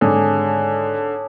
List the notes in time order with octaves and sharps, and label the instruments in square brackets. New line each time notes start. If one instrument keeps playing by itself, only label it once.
[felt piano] G#1 G#2 [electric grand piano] D3 [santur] G#4 [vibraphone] C#5 A5 D6